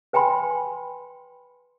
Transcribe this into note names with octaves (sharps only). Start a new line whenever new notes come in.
B4 G5 G#5 B5 C6